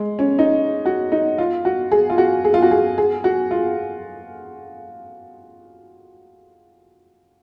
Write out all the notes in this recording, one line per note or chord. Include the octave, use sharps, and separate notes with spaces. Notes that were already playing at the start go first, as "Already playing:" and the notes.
Already playing: G#3
C#4
D#4
F#4
D#4
F4
F#4
G#4
F4
F#4
G#4
F4
F#4
G#4
G#4
F#4
F4